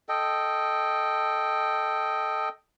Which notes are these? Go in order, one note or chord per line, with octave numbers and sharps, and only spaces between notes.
A4 D#5 G5